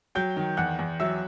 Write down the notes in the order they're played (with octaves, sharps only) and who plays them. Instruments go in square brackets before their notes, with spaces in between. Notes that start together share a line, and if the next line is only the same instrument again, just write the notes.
[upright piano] F#3 [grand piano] G5 G6
[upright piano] D#3
[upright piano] E2 [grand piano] F#5 F#6
[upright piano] E2
[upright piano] F#3 [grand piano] E5 E6